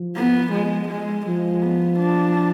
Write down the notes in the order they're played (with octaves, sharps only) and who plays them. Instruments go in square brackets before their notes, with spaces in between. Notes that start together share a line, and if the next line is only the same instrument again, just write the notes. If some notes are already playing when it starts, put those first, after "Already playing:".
Already playing: [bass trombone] F3
[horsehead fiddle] B3
G#3
G#3
[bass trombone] F3 [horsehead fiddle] G#3
[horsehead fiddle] B3
D4